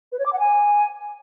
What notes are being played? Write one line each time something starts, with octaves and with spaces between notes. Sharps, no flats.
B4
C#5
D6
F#5
G#5